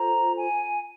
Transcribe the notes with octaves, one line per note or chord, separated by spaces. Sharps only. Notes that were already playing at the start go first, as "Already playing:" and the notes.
Already playing: F4 A4 C5 A#5
G#5